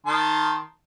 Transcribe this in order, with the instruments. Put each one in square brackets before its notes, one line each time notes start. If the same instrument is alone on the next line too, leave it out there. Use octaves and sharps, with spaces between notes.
[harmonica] D#3 A5 C6